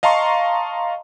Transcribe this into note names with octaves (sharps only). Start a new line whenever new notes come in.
D#5 F5 A5 A#5 C6 C#6